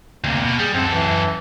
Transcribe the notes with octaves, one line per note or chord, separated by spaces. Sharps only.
D2 C3 A#3
B2
G3 G#4
F#2 C4 A4
E3